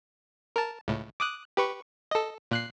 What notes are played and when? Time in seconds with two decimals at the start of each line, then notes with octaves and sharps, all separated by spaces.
0.56 A#4 A5
0.88 C#2 A2
1.20 D6 D#6 F#6
1.57 G4 B4 C#6
2.11 A4 D#5
2.51 A#2 F#6 C7